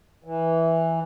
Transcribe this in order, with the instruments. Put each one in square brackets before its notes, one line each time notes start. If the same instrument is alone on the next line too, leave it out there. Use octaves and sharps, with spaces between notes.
[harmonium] E3